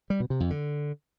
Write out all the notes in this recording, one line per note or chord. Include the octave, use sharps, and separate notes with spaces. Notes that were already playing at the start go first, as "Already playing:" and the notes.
G3
B2
C3
F2
D3